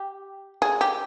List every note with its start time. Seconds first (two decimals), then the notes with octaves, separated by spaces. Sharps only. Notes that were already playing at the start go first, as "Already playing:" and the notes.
Already playing: G4
0.62 G#4
0.81 G4